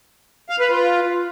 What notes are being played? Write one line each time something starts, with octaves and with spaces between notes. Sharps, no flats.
F5
B4
F4